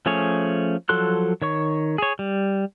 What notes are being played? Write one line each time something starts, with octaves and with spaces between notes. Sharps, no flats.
F3 A3 C#4 G#4 C#5
F3 F#3 A4 C6 F#6
D#3 C#5 C#6
G#4 C#5
G3